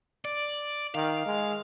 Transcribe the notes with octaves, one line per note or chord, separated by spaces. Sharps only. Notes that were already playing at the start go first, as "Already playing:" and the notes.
D5
D#3 F5
G#3